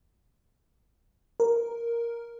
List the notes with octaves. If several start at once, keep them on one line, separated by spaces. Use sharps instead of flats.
A#4